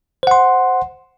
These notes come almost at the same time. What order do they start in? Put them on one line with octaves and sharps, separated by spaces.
C5 F#5 C6